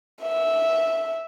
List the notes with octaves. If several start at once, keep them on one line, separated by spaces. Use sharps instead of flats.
E5